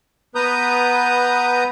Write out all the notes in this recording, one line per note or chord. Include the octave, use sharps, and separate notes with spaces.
B3 B4 A#5 D#6 G6